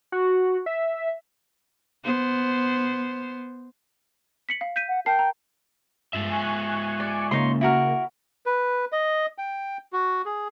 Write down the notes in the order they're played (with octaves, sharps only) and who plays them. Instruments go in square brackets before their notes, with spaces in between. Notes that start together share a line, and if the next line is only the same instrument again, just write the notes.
[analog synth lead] F#4
E5
[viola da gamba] B3 C5
[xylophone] B6 C#7 F#7
F5
G6 B6 D#7
[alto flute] F#5
[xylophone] A#4 A5 C7 [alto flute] G5
[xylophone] A#5
[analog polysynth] G2 [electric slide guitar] G#3 F4 E5
[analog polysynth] G#5 C#6 F#6
[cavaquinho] D5
[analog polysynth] C#3 A#3 [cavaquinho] D#4 C#5 C6
[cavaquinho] E4 F#4 A#4
[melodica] B4
D#5
G5
F#4
G#4